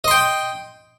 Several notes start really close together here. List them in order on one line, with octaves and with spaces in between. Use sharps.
D#5 C6 G5